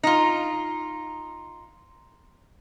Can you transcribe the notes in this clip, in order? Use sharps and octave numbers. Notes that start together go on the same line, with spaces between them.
D#4 F4